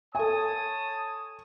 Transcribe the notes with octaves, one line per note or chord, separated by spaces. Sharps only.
A4 C#5 G#5 A5 D#6